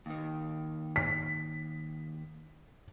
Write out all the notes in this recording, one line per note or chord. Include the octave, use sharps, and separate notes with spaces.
D#2 D#3
B6